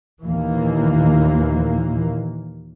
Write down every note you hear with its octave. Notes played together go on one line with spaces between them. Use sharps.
D#2 A#2 E3 A#3